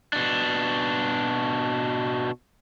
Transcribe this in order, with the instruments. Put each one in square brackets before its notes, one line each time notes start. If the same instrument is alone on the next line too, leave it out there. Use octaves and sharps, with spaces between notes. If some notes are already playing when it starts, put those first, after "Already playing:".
[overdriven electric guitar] B2 D4